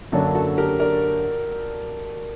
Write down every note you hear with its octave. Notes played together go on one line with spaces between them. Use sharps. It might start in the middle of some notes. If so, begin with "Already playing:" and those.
F#2 D3 F#3 A#3 D4 F#4 A4
F#4 A4
G4 A#4
A#4 D5